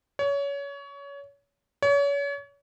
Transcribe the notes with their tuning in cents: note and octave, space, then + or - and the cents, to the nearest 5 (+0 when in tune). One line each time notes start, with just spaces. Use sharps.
C#5 +25
C#5 +35